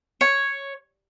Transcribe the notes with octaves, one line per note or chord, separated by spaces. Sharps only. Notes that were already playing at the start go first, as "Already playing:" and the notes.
C#5